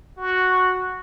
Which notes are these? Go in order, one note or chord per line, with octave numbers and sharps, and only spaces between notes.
F#4